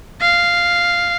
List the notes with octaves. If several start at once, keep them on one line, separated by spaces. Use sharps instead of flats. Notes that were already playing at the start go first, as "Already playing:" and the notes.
F5